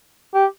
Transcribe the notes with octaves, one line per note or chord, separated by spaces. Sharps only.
G4